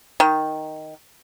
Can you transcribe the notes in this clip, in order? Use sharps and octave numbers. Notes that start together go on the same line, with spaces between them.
D#3